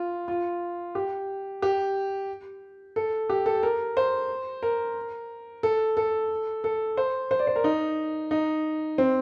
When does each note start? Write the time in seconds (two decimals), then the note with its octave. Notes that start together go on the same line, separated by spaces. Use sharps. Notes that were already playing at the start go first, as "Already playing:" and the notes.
Already playing: F4
0.28 F4
0.95 G4
1.62 G4
2.96 A4
3.30 G4
3.46 A4
3.63 A#4
3.97 C5
4.63 A#4
5.63 A4
5.97 A4
6.64 A4
6.97 C5
7.31 C5
7.39 D5
7.47 C5
7.56 A#4
7.64 D#4
8.31 D#4
8.98 C4